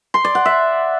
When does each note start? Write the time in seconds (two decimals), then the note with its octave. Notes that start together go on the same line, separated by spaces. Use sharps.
0.14 C6
0.25 D5
0.35 F#5
0.45 E5